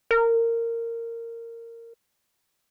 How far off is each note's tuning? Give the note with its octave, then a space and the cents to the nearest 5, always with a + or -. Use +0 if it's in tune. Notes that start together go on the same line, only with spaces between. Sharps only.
A#4 -15